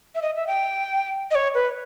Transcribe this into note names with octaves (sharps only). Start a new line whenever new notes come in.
E5
D#5
E5
G5
D#5
C#5
B4